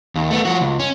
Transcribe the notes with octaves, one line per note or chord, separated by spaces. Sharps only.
D#2
A3 B3
F3 F#4
C#2
C#4